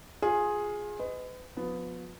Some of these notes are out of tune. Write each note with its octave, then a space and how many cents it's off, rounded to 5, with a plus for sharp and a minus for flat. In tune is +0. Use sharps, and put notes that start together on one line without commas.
F4 +25 G#4 +0
B4 +35 D#5 +0
F3 +35 B3 +10